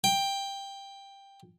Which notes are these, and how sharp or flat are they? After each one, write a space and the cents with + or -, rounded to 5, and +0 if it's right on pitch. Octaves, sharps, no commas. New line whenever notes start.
G5 +10